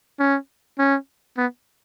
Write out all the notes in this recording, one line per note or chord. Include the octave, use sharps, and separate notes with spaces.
C#4
C#4
B3